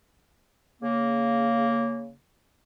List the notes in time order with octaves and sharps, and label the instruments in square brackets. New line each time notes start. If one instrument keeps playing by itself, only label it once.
[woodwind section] C#3 A#3